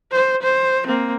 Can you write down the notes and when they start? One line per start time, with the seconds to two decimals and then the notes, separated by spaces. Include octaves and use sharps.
0.11 C5
0.43 C5
0.87 A#3 C4